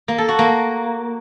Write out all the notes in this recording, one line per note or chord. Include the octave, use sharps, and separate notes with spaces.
A#3
A4
F#4
A#3